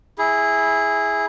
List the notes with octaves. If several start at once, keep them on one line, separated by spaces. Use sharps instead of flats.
E4 G#4